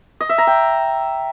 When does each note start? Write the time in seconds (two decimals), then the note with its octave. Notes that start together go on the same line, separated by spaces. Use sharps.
0.21 D#5
0.29 E5
0.38 A#5
0.47 G5